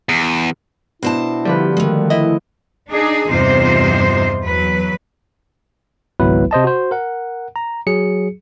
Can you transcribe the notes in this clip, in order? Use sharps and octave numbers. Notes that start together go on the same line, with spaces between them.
E2
B2 D4 E4 C5 A5
D3 F3 G3 B4
D#3 G#3 A3
E4 D#5
D4 D#4 G#4
E2 G2 C3 D#4 F4 C5
E2 F#3 B4
G#1 C#2 F#3 B3 E4 B4
C3 C5 D#5 A5
F#4 C5
A#4 F#5
A#5
F#3 G#4 C#7